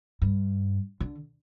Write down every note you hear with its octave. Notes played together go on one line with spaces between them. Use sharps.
G2
D3